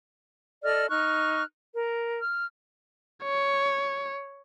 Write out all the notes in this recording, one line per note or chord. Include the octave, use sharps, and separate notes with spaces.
A4 D5 D#5 F6
D#4 C#6 F6 F#6
A#4
F6
C#5